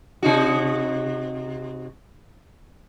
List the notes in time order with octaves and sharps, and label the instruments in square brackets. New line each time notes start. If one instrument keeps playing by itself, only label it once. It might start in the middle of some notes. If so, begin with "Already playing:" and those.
[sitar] C3 D#4 F#4